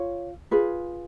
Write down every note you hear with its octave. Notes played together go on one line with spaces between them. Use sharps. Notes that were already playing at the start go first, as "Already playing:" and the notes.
Already playing: F4 C#5
F4 G#4 B4